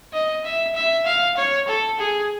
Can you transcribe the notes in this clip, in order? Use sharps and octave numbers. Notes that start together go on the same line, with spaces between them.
D#5
E5
E5
F5
C#5
A4
G#4